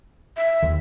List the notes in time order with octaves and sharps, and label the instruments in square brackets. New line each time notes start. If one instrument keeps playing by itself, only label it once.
[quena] E5
[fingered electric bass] D#2 D#3